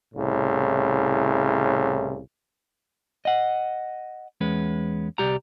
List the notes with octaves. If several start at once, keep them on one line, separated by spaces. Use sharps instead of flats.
C2 A2 C#3
D#5 F#5
E2 G#3 C#4 B4
C2 G3 G4 A#5